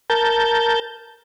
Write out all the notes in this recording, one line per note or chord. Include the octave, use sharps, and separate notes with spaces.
A#4 A5 G6